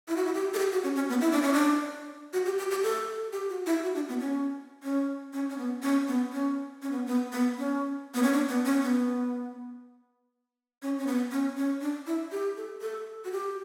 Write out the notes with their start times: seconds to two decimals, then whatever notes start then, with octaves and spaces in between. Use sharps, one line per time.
0.08 E4
0.16 F#4
0.25 E4
0.34 G4
0.54 A4
0.58 G4
0.72 F#4
0.83 C#4
0.95 C#4
1.09 B3
1.21 E4
1.31 D4
1.42 C#4
1.53 D4
2.33 F#4
2.46 G4
2.58 G4
2.71 G4
2.83 A4
3.33 G4
3.50 F#4
3.66 E4
3.83 F#4
3.95 D4
4.09 B3
4.21 C#4
4.83 C#4
5.33 C#4
5.50 C#4
5.58 B3
5.82 C#4
6.08 B3
6.33 C#4
6.82 C#4
6.91 B3
7.06 B3
7.32 B3
7.58 C#4
8.14 B3
8.23 C#4
8.33 D4
8.49 B3
8.65 C#4
8.82 B3
10.82 C#4
10.99 C#4
11.07 B3
11.31 C#4
11.57 C#4
11.81 D4
12.07 E4
12.32 G4
12.57 A4
12.81 A4
13.25 F#4
13.32 G4